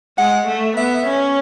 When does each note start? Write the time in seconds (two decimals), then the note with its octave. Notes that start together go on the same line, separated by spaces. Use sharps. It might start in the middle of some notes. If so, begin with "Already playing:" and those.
0.18 G#3 F#5
0.47 A3
0.77 B3 E5
1.07 C#4